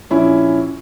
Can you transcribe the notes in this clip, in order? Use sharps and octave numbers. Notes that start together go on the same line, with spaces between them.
A#1 C#4 E4